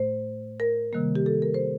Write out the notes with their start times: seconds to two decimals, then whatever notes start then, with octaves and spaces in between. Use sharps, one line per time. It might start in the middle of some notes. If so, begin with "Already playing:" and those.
Already playing: A2 A3 C5
0.60 A#4
0.93 C3 D#3 G3 A#3
1.15 G4
1.26 A4
1.42 A#4
1.54 C5